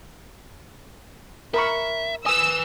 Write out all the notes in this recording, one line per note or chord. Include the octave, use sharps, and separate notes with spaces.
A#4 E5 B5 C#6
B4 G#5 D#6 E6